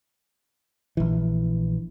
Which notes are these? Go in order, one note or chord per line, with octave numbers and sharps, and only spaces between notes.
A#1 E3